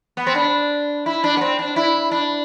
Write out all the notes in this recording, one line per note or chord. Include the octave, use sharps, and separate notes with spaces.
B3
C4
D4
E4
D4
B3
C4
D4
E4
D4